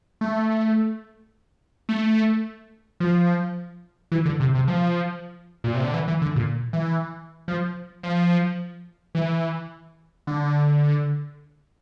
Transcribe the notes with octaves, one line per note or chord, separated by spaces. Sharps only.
A3
A3
F3
E3
D3
C3
C3
F3
A#2
C3
D3
E3
E3
D3
A#2
E3
F3
F3
E3
D3